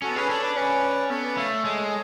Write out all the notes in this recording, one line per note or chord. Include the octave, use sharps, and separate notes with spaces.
C#4 F#4 A4
B3
C#4 G#4 B4
D4 A4 C#5
B4 D5
C#4 B4 D5
B3 A4 C#5
B4 D5
A3 C#5 F5
G#3 A4 C#5